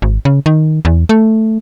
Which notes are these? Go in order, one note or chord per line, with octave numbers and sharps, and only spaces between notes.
G#1
C#3
D#3
E2
A3